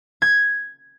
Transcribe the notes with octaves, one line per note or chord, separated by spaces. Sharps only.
G#6